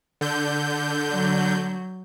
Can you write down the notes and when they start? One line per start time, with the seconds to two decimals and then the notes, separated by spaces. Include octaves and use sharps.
0.21 D3 G6
1.10 F#3